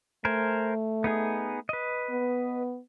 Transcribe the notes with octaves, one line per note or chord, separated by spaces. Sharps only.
A3 A#4 C5 G#5
B3 D#4 G#4
B4 D#5
B3